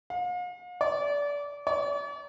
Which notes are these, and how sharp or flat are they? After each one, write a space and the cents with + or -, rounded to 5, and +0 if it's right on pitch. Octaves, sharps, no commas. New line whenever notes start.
F5 +45
D5 -25
D5 -40